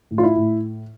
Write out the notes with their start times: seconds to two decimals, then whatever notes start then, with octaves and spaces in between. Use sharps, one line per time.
0.11 A2
0.18 F4
0.23 E4
0.36 A2